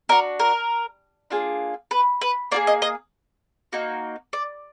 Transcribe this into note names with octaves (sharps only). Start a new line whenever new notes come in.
D4 F#4 A#4
A#4
A#3 D4 F4 G#4
B4
B4
A#3 F4 G#4 D5
D#5
D#5
A#3 D#4 F#4
D5